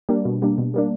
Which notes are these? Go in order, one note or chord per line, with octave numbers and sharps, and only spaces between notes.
G3 A#3 D4
B2
G3 A#3 D4
B2
G3 A#3 D4